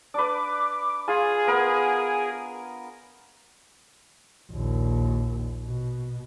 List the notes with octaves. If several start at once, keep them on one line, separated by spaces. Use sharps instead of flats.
D4 B4 D6
F4 G#4 G#5
B3 A#4
A#1 D#2
B2